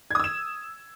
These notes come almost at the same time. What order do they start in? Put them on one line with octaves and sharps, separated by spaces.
G#6 D#6 E6 E7